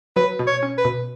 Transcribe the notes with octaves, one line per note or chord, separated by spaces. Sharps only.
F#3 B4
B2
C#5
C#4
B4
B2